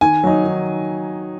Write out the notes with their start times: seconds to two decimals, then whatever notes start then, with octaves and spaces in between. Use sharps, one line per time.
0.01 D#3 G#5
0.24 F#3 D#4
0.44 D#3